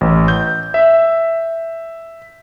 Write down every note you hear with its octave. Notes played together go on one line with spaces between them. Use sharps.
A1
G6
E5